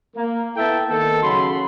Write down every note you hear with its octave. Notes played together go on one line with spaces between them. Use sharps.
A#3
B3 E4 A4 E5 G5 A5
D#3 A#3 B3 A4
C#3 F#3 F#4 B5 C6